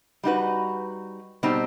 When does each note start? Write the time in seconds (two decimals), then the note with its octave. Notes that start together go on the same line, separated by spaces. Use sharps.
0.24 G3 D#4 F#4 B4
1.43 B2 G3 C4 D#4